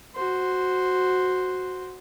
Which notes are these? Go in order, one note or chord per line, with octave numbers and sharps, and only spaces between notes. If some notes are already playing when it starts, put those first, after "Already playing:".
F#4 C5